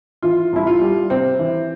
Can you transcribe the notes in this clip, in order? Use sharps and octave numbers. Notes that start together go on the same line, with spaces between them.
E3 F4
C2 E4
F4
G3
C3 C4
E3